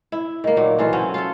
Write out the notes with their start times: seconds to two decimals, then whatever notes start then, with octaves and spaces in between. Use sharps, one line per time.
0.12 E4
0.44 D#3 A#3
0.57 A#2 F#3
0.78 E3 A3 F4
0.93 F#3 C4 C#4
1.14 F4 A4